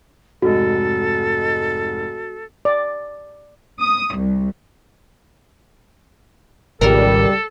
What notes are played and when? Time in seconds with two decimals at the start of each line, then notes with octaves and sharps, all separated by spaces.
0.42 F1 G#2 F#4 A4 D#5
2.65 D5
3.80 D#6
4.17 C2
6.81 G#1 C#2 G3 A4 A#4